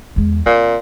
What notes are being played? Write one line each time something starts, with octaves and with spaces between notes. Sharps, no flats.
E2 G#3
A#2 C4